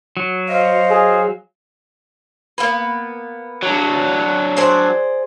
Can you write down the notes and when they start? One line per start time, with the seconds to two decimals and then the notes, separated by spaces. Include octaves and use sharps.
0.17 F#3
0.49 C5 D#5 F5
0.90 G#4
2.58 A#3 B3 B4
3.63 F#3 D4
4.57 G#4 C5 D5